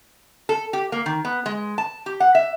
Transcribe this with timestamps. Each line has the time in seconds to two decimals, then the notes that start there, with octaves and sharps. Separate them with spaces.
0.49 A4
0.73 G4
0.92 A#3
1.06 D#3
1.25 B3
1.46 G#3
1.78 A5
2.06 G4
2.20 F#5
2.35 E5